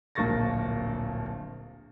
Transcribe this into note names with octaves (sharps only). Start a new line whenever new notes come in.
D1 A#1 A#3 C#6 A6 A#6